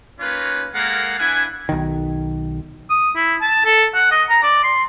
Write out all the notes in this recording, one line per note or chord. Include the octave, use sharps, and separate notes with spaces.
A#3 C#4 D#4 F4 B4 C#5
G#3 A#3 A4 A#4 F5 F#5
D4 E4 B4 F#5 G#5
B1 D#3
D#6
E4
A5
A4
F#5
D#5
A#5
D5
C6